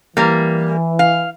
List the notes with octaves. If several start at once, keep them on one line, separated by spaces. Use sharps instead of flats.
E3 G3 A#3
F5